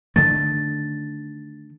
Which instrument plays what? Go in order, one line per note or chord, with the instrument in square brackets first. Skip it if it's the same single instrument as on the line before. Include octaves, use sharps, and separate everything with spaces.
[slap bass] D3 D#3 A3 [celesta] A6